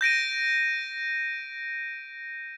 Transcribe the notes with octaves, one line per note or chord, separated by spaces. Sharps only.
G6 A#6 D7 D#7